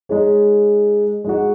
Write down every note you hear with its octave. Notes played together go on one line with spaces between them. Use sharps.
G#3 D#4 G#4 C#5
G#3 D#4 F#4